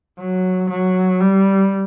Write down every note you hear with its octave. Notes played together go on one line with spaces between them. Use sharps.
F#3
F#3
G3